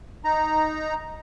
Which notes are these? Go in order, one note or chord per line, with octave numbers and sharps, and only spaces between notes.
D#4 A#5